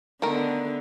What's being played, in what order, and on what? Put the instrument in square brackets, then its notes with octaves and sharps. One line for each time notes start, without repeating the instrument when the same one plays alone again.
[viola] D3 B3 [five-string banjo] D#3 A3 A#4